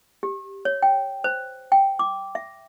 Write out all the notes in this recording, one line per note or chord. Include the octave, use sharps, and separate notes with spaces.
G4
C#5
G5
C5
G5
D6
E5